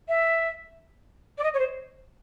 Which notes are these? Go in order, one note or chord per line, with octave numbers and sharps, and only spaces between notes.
E5
D5
D#5
C#5
C5